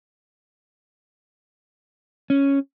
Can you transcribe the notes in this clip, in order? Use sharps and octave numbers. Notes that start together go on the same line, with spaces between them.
C#4